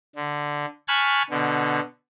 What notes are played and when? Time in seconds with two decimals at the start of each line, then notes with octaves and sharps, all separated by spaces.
0.16 D3
0.88 G#5 A5 B5 C#6 F6 F#6
1.30 B2 D3